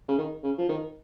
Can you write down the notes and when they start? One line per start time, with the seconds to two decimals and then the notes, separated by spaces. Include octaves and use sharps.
0.08 C#3
0.18 D#3
0.43 C#3
0.58 F3
0.69 D#3